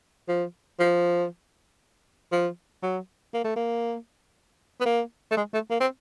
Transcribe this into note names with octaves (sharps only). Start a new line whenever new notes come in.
F3
F3
F3
F#3
A#3
A3
A#3
B3
A#3
A3
G#3
A3
A#3
C4